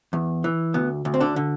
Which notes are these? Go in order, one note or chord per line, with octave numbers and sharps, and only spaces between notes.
E2
E3
D2 B3
D2
C4
D3 D4
D3